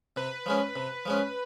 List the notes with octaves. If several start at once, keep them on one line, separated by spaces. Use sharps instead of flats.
C3 B4
F3 G#3 C#4
C3
F3 G#3 C#4